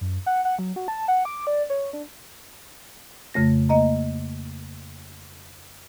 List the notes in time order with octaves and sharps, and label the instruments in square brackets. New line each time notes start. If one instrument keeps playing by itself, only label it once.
[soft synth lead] F#2
F#5
F#5
F#3
F#4
A5
F#5
D6
D5
C#5
D4
[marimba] F2 C#3 A3 A#6
A#3 D#5 A#5